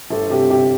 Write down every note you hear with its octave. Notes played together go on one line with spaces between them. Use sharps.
G1 A4
C3 G4
C3 G4